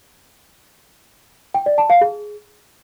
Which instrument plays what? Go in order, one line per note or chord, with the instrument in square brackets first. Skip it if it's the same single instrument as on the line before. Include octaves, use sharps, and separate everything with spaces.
[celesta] G5
D5
A5
F5
G#4